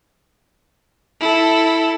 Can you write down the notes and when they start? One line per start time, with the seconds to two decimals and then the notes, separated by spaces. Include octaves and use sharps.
1.21 E4 A4